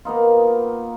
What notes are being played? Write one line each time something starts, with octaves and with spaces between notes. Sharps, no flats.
A#3 B3 D#4 F4